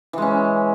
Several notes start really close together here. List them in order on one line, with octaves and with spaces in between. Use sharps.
E3 G#3 C#4